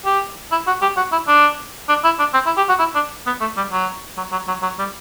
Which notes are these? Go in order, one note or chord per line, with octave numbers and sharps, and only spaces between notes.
G4
E4
F#4
G4
F#4
E4
D4
D4
E4
D4
C4
E4
G4
F#4
E4
D4
B3
A3
G3
F#3
F#3
F#3
F#3
F#3
G3